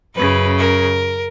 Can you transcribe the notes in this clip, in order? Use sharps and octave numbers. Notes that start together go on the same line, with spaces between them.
F#2 C#3 B4
A#4